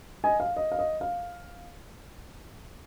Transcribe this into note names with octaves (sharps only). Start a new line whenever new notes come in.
D#5 G#5
F5
D#5
F5
D#5
F5